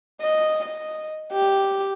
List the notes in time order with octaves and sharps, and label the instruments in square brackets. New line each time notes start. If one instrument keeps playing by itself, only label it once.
[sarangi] D#5
D#5
G4